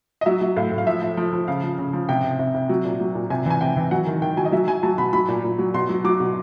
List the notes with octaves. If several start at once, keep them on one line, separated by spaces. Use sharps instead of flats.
D#5
F#3 E5
F#3
A2 F5
A2
F5
F3 E5
F3
F3
F3
C#3 F5
F3
C#3
F3
C3 G5
C3
C3
C3
F#3
A#2
F#3
A#2
C3 G#5
E3 G#5
C3 G5
E3
F#3 F#5
D#3
D#3 G5
F#3 G#5
D#5
F#3 E5
F#3 G#5
F#3 A5
B2 B5
F#3 B5
A#2
A#2
F#3
B2 C6
F#3
F#3 D6
B2